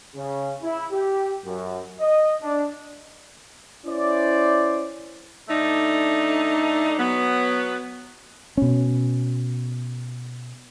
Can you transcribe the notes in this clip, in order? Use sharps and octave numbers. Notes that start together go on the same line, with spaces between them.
C#3
E4
G4
F#2
D#5
D4
C#4 E4 C5 D5
D3 A3 D4 D#4
F#3 B3
B2 C#4